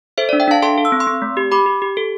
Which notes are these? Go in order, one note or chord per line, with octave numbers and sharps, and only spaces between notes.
A4 C5 E5
D5
D4
E5 G5
D4 F5 A5
A4 A5 C6
A4
E6
C4
C6 E6
C4
A3
G4
G4 B5 D6
G4
G4
A4